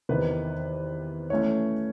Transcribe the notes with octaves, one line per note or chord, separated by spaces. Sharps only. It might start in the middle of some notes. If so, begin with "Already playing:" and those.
E2 C3 D#3 B4
E3 A3 C#4 C#5